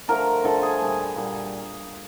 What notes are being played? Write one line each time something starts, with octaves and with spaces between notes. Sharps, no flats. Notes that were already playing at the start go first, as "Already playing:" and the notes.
D3 F3 A3 A#4 A#5
D3 F3 A3 A4 A5
G#4 G#5
A#2 G3
A#2 G3